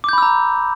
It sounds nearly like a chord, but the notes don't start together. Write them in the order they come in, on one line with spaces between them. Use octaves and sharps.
D6 G6 B5 E6 A#5